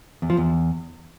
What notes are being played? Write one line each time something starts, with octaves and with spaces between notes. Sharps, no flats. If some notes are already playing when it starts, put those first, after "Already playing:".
E2
F3
E2